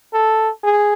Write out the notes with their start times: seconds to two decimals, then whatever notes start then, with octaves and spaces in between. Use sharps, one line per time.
0.13 A4
0.64 G#4